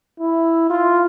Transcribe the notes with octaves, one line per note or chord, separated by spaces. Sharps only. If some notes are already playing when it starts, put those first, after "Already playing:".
E4
F4